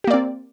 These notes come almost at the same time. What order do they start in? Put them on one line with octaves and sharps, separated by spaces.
G4 A#3 D5 C4